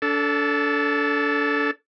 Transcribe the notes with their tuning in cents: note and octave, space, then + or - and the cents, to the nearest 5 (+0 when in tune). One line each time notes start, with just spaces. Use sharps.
D4 -35 A4 +0